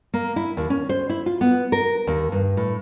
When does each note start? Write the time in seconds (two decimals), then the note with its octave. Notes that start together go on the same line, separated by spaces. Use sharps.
0.14 A#3
0.36 E4
0.57 D#2
0.70 C#4
0.89 C5
1.09 E4
1.26 F4
1.41 B3
1.72 A#4
2.07 D#2
2.32 G2
2.57 A2